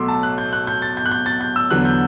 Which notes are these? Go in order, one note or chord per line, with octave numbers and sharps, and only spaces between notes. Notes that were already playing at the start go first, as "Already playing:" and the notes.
Already playing: B1 B2 F#3 A3 C6 D6 E6
A5
F#6
G6
F#6
G6
A6
G6
F#6
G6
A6
G6
E6
E2 D3 F#3 B3 F#6
G6